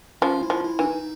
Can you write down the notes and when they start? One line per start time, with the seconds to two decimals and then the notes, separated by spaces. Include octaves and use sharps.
0.22 F3 C#4
0.43 E4
0.50 F3
0.64 E4
0.79 E3 D4
0.85 D#4